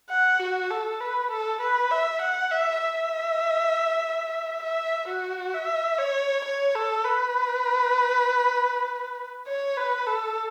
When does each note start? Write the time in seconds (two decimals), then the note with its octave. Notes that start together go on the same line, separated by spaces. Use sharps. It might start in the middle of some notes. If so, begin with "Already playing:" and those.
0.10 F#5
0.40 F#4
0.70 A4
1.01 B4
1.31 A4
1.61 B4
1.91 E5
2.22 F#5
2.51 E5
2.82 E5
4.63 E5
5.08 F#4
5.54 E5
5.98 C#5
6.44 C#5
6.75 A4
7.05 B4
9.47 C#5
9.77 B4
10.07 A4